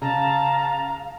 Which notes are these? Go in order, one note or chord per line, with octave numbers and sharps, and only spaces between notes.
C#3 F5 A5 A#5